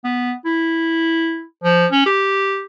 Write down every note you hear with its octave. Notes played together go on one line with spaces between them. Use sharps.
B3
E4
F3
C#4
G4